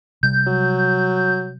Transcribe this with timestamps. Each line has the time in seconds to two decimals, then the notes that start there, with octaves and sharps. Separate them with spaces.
0.23 C3 G3 G6
0.47 F#3